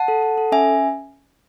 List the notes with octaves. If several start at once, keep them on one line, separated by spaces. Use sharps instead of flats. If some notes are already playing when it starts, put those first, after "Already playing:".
Already playing: F#5 A5
A4
A4
A4
C#4 E5 G#5